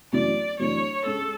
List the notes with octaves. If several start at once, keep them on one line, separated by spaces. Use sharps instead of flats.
F#2 E3 A3 C#4 E4 D5
F#2 E3 A3 D4 A4 C#5
G#2 G#3 C#4 A4